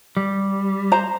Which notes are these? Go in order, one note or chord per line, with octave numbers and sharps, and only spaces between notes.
G3
C5 A#5